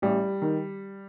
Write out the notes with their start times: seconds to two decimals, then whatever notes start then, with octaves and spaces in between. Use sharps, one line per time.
0.02 A1 G3
0.42 D#3